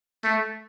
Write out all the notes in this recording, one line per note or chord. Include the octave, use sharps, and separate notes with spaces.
A3